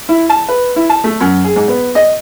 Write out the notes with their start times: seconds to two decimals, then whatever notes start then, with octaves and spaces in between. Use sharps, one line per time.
0.09 E4
0.29 A5
0.49 B4
0.76 E4
0.89 A5
1.04 A3
1.21 F#2
1.44 G#4
1.56 G#2
1.68 B3
1.95 D#5